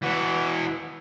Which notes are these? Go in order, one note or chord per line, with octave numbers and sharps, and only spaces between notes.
E3 F#4